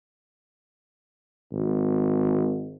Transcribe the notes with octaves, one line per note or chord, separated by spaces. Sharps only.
G#1